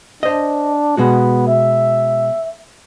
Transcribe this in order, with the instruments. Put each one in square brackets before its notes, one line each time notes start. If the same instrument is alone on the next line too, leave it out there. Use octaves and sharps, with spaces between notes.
[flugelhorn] D4 [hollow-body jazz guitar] C5 D#5
[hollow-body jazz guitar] B2 G#3 F#4 [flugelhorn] B3
[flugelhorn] E5